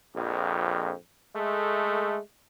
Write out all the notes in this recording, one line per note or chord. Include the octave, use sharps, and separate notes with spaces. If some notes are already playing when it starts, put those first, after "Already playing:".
A#1 F2
G#3 A3